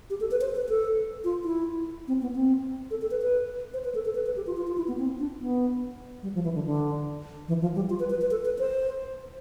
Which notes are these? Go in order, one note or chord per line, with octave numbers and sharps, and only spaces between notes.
G4
A4
B4
C5
B4
A4
F4
E4
C4
B3
C4
A4
A4
B4
B4
C5
B4
A4
A4
B4
B4
G4
F4
F4
F4
E4
B3
C4
D4
B3
G3
F3
E3
D3
D3
E3
F3
G3
F4
B4
B4
B4
A4
B4
C5